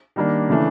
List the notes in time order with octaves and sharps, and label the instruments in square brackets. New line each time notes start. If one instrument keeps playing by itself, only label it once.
[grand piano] D#3 G3 A#3 D4
C#3 E3 A3 D4